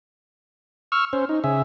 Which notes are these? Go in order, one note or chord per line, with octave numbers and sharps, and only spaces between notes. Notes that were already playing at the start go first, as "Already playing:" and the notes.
C#6 E6 F6
C#4 C5
D#4
C#3 G#4 E5